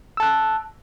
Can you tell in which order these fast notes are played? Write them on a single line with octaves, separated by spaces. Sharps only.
E6 A5 F#6